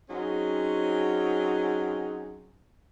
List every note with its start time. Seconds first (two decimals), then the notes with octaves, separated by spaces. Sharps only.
0.08 F#3 C4 C#4 D#4 G#4